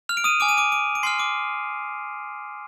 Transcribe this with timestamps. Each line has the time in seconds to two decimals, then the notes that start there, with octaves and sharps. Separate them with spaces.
0.09 F6 F7
0.17 D7
0.24 D#6 D#7
0.40 G#5 D6 F6 D7
0.49 D#7
0.57 D6 D7
0.72 D6 D7
0.95 D7
1.03 G#5 C6 D6 F6 C7
1.19 D6 D7